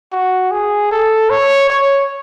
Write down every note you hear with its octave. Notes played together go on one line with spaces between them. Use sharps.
F#4
G#4
A4
C#5
C#5